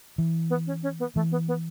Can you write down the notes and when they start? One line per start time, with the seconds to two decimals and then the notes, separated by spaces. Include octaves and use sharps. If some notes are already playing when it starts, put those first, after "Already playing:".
0.18 E3
0.50 B3
0.66 C#4
0.83 C#4
0.99 B3
1.15 E3 A3
1.31 B3
1.48 B3